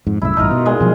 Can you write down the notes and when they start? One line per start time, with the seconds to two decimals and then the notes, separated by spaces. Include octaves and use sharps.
0.07 F2 G#2
0.22 C2 F#2 A2 E4 E5
0.37 A1 G2 D#4 F4 A#4
0.51 B2
0.65 A#2 G#3 D#5
0.80 B2 F3 F#3